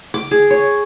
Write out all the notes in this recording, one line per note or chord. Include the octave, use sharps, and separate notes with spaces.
D6
G#4
C#5